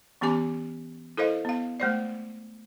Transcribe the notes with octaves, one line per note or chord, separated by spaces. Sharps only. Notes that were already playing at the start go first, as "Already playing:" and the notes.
E3 B3 C#4 G4 G#5 D6
E4 A4 A#4 C5 D#5 F5
B3 F5
G#3 A3 C5 D5